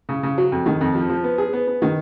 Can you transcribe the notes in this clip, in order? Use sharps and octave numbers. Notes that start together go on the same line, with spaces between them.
C#3
C#3
F#3
F2
D#3
F2
F3
F3
B3
G#4
B3
B3
D#3